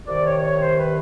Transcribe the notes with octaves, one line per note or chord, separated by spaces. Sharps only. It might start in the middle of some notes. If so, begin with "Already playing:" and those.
C2 C3 D#3 D5
C#5
C#5
C5
B4